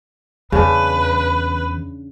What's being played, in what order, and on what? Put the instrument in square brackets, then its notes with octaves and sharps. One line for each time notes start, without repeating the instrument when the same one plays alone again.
[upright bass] E2 [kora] C#3 D4 [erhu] B4